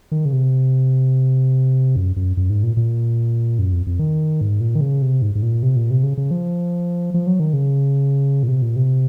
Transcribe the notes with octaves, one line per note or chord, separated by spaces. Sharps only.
D#3
C#3
C3
F#2
F#2
F#2
G#2
A#2
A#2
F#2
F2
F2
D#3
G#2
A#2
D#3
C#3
C3
G#2
G#2
A#2
C3
A#2
C3
C#3
C#3
F3
F3
F#3
D#3
C#3
A#2
C3
A#2
C3